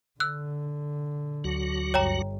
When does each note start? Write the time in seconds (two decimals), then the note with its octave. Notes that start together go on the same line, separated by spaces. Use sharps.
0.20 D3 E6 F#6
1.44 D2 F#3 F#4
1.94 G1 C#5 G5 A#5